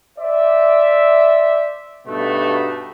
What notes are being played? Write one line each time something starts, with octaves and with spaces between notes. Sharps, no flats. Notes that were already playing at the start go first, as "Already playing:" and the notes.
C5 D5 E5
G2 B2 A3 D#4 F#4